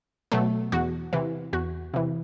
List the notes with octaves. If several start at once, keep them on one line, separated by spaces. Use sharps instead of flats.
B2 F#3 A3
E2 F#4
C3 E3
E2 F#4
C3 E3